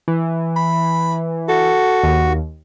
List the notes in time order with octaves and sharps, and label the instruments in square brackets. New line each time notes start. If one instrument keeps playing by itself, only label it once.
[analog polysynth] E3
[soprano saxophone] B5
[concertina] F#4 [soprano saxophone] A4
[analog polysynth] D#2